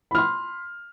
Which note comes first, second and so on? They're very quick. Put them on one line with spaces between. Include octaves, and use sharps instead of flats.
B5 F6 C6